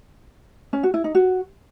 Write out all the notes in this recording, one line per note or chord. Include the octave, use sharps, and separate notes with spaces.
C#4
F#4
E4
D#4
F#4